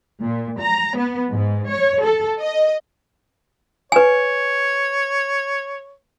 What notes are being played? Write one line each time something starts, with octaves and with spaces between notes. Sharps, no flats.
A#2
A#5
B3
G#2
C#5
A4
D#5
B4 C#5 G#5